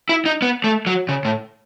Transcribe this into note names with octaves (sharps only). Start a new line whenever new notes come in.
E4
D#4
B3
A3
F#3
C#3
A2